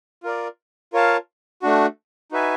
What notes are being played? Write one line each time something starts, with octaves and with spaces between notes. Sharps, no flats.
F4 A#4 D5
F4 A#4 C#5 F5 A5
A3 D4 F#4
D#4 F#4 B4 E5 G#5